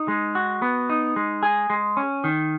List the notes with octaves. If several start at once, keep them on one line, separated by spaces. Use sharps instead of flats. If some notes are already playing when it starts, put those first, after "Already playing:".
Already playing: D#4
G#3
F#4
B3
D#4
G#3
G#4
G#3
C#4
D#3